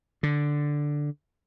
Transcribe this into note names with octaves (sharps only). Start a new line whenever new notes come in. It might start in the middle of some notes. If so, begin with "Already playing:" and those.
D3